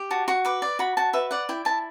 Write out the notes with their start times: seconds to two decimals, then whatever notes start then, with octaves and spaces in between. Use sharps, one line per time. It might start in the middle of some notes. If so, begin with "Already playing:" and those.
Already playing: G4
0.11 F#4 A5
0.28 F#4 C#6
0.45 B4 D6
0.62 D5
0.79 F#4 B5
0.97 F#4 A5
1.13 B4 E5
1.31 D5 F#5
1.49 E4 G5
1.65 E4 A5